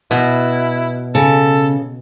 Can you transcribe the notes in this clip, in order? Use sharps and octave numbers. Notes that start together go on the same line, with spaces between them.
B2 E4
C#3 A4